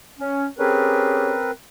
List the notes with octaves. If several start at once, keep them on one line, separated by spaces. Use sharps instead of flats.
C#4
C4 C#4 G4 G#4 A#4 B4